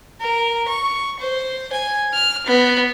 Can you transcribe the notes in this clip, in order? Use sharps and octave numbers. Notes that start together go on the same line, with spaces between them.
A#4
C#6
C5
G#5
F6
B3